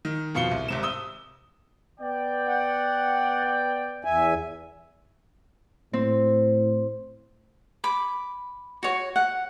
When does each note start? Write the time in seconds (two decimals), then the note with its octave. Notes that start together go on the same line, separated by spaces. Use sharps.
0.05 D#3
0.35 F2 B2 F5 C#7 G7
0.51 C2
0.68 G#1 C3 E7
0.83 D#6 E6 G7
2.00 B3 D5 G5
2.48 F#5
4.05 E2 E5 G#5
5.93 A2 C4
7.84 B5 D6
8.83 F#4 C#5
9.16 F#5